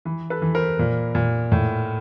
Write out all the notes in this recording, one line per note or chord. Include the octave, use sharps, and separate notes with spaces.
E3
A4 B4
E3
A#4 C5
A#2
A#2
A2